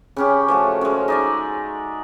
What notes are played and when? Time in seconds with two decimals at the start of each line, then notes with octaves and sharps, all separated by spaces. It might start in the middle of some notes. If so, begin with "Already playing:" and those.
0.16 C#3 C#4 G4
0.48 F3 A3 F#4
0.81 G#3 C#4
1.08 D#4 D5 E5